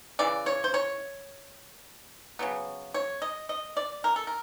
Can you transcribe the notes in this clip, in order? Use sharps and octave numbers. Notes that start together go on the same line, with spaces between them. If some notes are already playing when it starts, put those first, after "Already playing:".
C#3 E3 D5
C#5
C5
C#5
C#3 F#3 B3
C#5
D#5
D#5
D5
A#4
A4
A#4